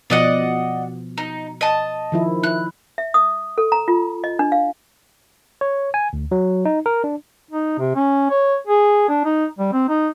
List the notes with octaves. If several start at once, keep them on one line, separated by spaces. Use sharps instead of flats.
B2 F3 D5 D#5 F#5
D#4
D#5 A5
D#3 F3 E4
E4 F#6
E5
D#6
A4
A#5
F4
D#5
D4
F5
C#5
G#5
D2
F#3
D#4
A#4
D4
D#4
C3
C#4
C#5
G#4
D4
D#4
G3
C4
D#4